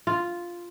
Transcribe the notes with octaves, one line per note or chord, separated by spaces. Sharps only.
F4